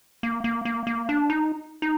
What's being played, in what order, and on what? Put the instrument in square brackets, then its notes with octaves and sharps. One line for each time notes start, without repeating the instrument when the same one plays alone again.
[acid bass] A#3
A#3
A#3
A#3
D4
D#4
D#4